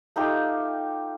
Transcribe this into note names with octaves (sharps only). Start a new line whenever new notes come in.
A3 D#4 F4 G4